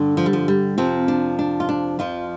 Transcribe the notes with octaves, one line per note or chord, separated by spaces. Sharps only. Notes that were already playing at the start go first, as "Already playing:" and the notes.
Already playing: G2 D3
F3
G3
F3
G3
F2 C3 F3 C4
D4
D4
F4
D4
F2 F3 F4